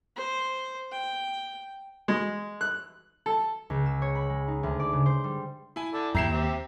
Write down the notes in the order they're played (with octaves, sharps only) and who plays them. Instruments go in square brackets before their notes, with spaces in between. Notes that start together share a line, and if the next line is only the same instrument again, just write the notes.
[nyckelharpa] C5
G5
[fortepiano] G#3
F#6
A4
[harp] C#2
E6
C#5
B5
G#3
D#4
D2
D5
C#3
C5
G3
[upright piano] E4 G#5
[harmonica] A4 D5
[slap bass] D#2 [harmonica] E4 E5 G5 [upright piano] A#5 C7 E7
[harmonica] C4 G4 E5